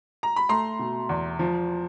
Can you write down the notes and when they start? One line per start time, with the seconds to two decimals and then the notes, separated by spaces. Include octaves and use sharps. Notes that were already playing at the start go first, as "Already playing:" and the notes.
0.23 A#5
0.36 B5
0.49 A3 A#5 C6
0.79 B2
1.09 E2
1.39 F3